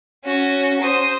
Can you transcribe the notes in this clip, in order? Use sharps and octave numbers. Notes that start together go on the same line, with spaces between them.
C#4 F#4
C5 D#6